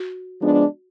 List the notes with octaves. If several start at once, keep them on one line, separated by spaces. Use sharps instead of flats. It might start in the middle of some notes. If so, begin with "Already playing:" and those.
Already playing: F#4
F3 G#3 B3 D4